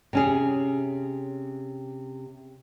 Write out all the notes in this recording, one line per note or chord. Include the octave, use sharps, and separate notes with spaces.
C3 C#4 G#4